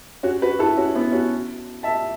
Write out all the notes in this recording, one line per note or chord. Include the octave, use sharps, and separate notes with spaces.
C#4 F#4
F#4 B4
E4 A4
C#4 F#4
B3 E4
C#4 F#4
E5 A5